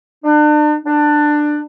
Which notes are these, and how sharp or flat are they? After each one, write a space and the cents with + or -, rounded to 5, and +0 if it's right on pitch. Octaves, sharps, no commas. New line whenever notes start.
D4 +40
D4 +15